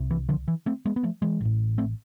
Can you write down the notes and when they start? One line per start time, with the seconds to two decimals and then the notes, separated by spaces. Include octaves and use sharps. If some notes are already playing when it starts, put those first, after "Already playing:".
Already playing: C2 C3
0.11 E3
0.29 D3 F3
0.48 E3
0.66 A3 C4
0.86 G#3 B3
0.96 B3
1.03 F3 A3
1.22 E3 G#3
1.41 A1 A2
1.78 A3 C4